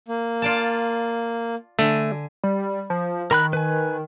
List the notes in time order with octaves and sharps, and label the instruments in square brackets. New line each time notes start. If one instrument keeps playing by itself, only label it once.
[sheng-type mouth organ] A#3
[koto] F4 D5 A5
[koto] D3 G#5 [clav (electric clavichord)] A3
[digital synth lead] G3
F3
[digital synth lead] D#3 [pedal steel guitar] A#4 B5 F#6
[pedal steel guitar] B4 G#5